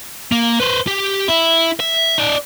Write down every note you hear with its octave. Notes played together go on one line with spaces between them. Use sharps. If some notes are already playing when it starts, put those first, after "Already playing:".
A#3
B4 C5
G4
E4
E5
D#4 D5